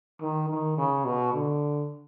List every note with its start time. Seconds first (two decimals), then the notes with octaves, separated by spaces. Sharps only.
0.21 D#3
0.49 D#3
0.78 C#3
1.05 B2
1.34 D3